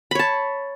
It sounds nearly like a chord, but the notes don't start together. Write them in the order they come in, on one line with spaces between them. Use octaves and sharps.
B5 C#5 A5